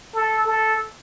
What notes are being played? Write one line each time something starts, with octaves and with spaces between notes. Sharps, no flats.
A4
A4